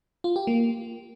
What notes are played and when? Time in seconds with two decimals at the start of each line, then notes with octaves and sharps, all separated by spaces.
0.24 F4
0.36 G4
0.47 A#3